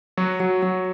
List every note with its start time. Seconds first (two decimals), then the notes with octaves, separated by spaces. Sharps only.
0.17 F#3 F#4
0.40 F#3
0.62 F#3